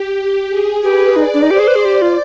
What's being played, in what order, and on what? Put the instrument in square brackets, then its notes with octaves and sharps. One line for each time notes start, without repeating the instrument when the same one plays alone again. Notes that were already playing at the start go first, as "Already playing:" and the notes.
Already playing: [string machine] G4
G4
G#4
[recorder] G4 [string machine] B4
[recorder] D#4 [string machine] D5
[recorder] D4
D#4
[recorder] G4 [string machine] C5
[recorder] G#4
B4
G#4
[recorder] G4 [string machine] D5
[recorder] F4